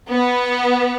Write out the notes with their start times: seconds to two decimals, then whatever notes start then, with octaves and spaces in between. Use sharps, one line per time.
0.10 B3